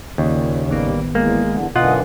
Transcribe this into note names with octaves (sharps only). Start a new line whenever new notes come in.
D#2 A#2 C#3
A1 D#3 G3 A#3 B3
E2 G#3 A#3
E2 D3
F#2 B2 D3 E3 F4 D#5 F#5